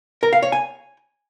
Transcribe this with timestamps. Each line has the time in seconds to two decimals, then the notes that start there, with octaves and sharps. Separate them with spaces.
0.23 A#4
0.33 F5
0.42 C#5
0.52 G#5